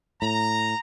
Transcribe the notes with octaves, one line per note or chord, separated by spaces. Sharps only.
A2 A#5